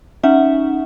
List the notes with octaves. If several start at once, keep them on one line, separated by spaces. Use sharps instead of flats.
C#4 D#4 E5 F#5